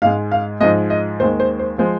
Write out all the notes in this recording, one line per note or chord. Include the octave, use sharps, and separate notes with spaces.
G#2 G#3 F5
F5
G#2 F3 G#3 D#5
D#5
D#2 D#3 G#3 C5
C5
C5
F3 G#3 C5